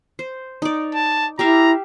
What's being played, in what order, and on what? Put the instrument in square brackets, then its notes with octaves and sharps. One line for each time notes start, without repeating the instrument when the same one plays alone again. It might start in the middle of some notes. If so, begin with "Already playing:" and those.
[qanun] C5
D#4 D5
[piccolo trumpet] A5
[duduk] E4 [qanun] G4 E5 F5 [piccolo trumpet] A#5